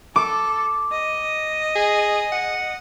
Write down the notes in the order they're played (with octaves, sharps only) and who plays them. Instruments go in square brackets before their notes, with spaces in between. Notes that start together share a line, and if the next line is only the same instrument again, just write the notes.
[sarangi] A4 [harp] D6
[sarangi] D#5
[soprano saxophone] G#4
F#5